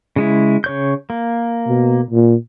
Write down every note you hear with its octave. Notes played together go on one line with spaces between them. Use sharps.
C#3 G#3 E4
C#3 C#5 G6
A#3
B2
A#2